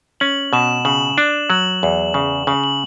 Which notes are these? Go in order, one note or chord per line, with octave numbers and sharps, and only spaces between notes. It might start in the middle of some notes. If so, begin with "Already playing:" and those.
C#4 F#7
B2 E7
C#3 F#7
D4
F#3 F#7
E2
C#3
C#3 F#7
F#7